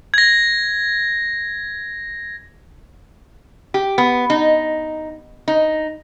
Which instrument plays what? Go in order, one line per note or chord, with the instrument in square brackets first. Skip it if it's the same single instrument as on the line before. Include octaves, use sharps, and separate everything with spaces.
[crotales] G#6 A#6
[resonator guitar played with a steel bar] G4
B3
D#4
D#4